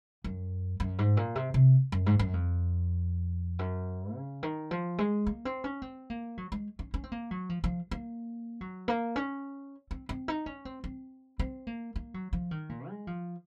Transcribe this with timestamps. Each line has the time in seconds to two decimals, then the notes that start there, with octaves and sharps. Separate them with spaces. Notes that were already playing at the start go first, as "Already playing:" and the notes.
0.24 F#2
0.80 F#2
0.99 G#2
1.17 A#2
1.36 C3
1.54 C3
1.92 F#2
2.06 G#2
2.19 F#2
2.33 F2
3.59 F#2
4.15 C#3
4.43 D#3
4.71 F3
4.98 G#3
5.27 A#3
5.45 C4
5.64 C#4
5.82 C4
6.10 A#3
6.38 F#3
6.52 G#3
6.79 C#4
6.94 C#4
7.04 C4
7.12 A#3
7.31 F#3
7.49 F3
7.64 F3
7.91 A#3
8.61 F#3
8.88 A#3
9.16 C#4
9.91 C4
10.09 C4
10.28 D#4
10.46 C#4
10.65 C4
10.84 C4
11.39 C4
11.67 A#3
11.96 A#3
12.14 F#3
12.33 F3
12.51 D#3
12.69 A#2
12.88 G#3
13.07 F3